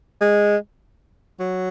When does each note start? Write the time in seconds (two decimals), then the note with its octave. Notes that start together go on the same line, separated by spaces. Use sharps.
0.21 G#3
1.40 F#3